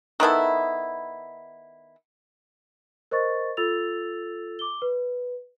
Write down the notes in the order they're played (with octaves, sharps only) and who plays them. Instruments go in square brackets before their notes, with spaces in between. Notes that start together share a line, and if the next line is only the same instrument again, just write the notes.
[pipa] D#3 B3 E4 A4
[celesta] A#4 C5 D#5 C#6 A6
F4 A4 E6 A6 F7
D6 G7
B4